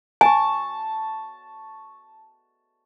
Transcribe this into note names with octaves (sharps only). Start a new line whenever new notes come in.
G#5 A5 C#6